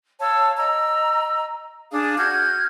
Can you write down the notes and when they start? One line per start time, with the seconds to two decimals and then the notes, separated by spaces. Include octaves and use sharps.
0.20 C#5 F5 A5 E6
0.57 D#5 A#5 E6
1.92 D4 G#4 F5 D#6
2.18 F#4 F6 G6 G#6